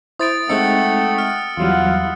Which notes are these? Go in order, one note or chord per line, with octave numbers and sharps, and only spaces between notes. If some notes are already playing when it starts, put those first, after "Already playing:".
E4 C5 D#6 A6 D7
G#3 A3 C4 D#4 F#5 G5 E6 C#7
F6
E2 F#3 G3 E4 F4 F#5